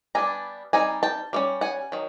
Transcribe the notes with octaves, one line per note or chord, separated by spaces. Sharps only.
G3 B3 D4 G#5 A#5
G3 C4 D#4 G#5 A#5
G5 A5
G3 A#3 C#4
F#5 G#5
D#3 F#3